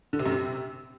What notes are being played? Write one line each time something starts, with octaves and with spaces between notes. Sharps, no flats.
D3
C3
F#2
C3